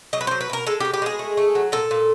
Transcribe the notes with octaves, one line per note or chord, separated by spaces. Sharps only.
F#3 D#5
B4
F#3 C5
B4
B2 A#4
G#3 A4
G4
B2
G4
G#3 G#4
A3
A3
F#3
A#2 A4
A#2